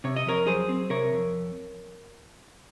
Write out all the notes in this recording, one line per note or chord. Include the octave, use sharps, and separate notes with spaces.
C3 C#5
D#5
F2 A#4 C#5
F#3 G#4 C5
C4
C3 A#4 C#5
F2